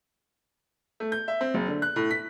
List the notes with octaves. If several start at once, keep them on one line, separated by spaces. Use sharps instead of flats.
A3
G6
E5
C4
F#1
D3
F#6
A2
B6